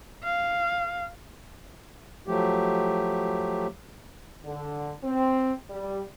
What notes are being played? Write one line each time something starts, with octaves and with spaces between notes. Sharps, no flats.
F5
F3 F#3 A3 G4
D3
C4
G3